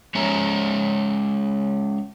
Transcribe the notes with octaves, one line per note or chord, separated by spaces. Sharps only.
G#3 C#4 C#5 E5 A#5